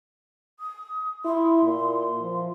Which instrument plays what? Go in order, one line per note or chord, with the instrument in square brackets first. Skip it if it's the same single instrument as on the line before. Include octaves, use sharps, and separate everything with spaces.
[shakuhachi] D#6
[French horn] E4 [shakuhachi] C6
[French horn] A#2
F3